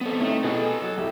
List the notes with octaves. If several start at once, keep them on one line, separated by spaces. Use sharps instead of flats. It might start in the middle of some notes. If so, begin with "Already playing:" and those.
B3 C4 A4
C3 A3 C#4 D#4
B2 G#4 A4 G#5
F#3
C2 E4 G4